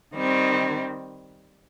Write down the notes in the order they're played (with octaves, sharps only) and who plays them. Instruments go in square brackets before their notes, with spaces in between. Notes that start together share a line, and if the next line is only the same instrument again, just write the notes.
[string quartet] D#3 G3 C4